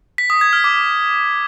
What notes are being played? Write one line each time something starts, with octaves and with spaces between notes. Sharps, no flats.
B6
D#6
G#6
F6
D6